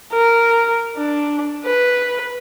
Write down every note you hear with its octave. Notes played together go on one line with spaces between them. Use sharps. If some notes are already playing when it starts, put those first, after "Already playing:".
A#4
D4
B4